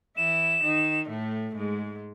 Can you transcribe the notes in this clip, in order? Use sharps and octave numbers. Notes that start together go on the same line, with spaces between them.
E3 E4 E7
D#3 D#4
A2 A3
G#2 G#3